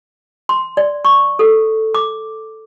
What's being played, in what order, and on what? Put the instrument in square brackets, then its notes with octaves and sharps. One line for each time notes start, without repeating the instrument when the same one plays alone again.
[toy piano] C6
D5
C#6
A4
D6